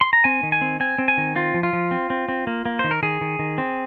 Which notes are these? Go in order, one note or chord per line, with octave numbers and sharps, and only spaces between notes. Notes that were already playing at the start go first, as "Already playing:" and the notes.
C6
A#5
C4 G#5
D#3
G#5
C4
C4 G#5
C4
G#5
D#3
C4 F4
F3
F4
F3
C4
C4
C4
A#3
A#3
D#3 C5
A#4
D#3 G#4
D#3
D#3
C4